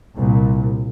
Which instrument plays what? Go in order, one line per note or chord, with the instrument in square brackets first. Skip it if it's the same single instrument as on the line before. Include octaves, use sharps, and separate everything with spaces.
[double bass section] C2 A#2